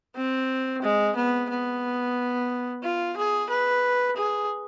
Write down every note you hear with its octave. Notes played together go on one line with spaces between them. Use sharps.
C4
G#3
B3
B3
F4
G#4
B4
G#4